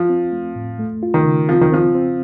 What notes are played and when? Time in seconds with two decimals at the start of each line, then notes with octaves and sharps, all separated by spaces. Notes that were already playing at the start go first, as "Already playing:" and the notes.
Already playing: F3
0.10 C4
0.32 A3
0.56 A2
0.79 A3
1.03 F4
1.14 D#3
1.25 C#3
1.49 F3 C4
1.61 D#3
1.72 F3 C4
1.95 C4